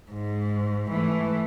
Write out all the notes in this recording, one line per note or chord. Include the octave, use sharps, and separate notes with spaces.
G#2
E3 A3